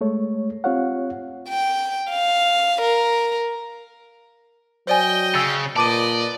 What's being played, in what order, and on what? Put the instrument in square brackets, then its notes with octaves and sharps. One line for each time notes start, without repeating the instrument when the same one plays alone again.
[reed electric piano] G#3 A3 C#5
C4 F4 G4 C#5 F5 F#5
[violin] G5
F5
A#4
[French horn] F#3 [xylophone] C5 D5 G#5 [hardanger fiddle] D#5 G5
[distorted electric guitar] C#3 [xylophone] E6 A6
[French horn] A#2 [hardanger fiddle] B4 D#5 [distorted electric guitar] D5 [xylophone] A5 D6 D#7